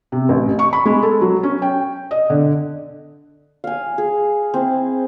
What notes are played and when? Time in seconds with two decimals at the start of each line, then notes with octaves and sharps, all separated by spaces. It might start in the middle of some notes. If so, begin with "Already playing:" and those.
0.12 C3
0.29 A1
0.59 C#6
0.73 B5
0.86 G#3
1.03 A4
1.21 F#3
1.43 C#4
1.62 G5
2.11 D#5
2.30 D3
3.64 F5 G#5
3.98 G#4
4.54 C4 E4